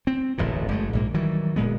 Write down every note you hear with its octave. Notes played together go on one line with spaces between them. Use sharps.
C4
D1 A1 F2 A#2
F#1 G#3 A3
A#1 G#2 A#3
D#3 E3 F#3 G3
D1 A#2 G#3 B3